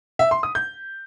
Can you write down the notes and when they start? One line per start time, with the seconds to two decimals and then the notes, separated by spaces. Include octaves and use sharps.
0.19 E5
0.31 C6
0.43 D#6
0.55 G6